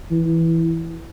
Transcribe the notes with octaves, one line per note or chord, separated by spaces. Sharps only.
E3